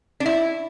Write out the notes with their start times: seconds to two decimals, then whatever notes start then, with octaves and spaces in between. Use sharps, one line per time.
0.20 D4
0.26 E4